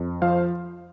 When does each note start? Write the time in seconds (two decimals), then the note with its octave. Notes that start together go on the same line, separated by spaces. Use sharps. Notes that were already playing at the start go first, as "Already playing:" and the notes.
Already playing: F2
0.22 F3 C5 F5